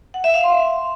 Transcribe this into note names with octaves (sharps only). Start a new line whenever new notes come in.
F#5
E5
F5
C6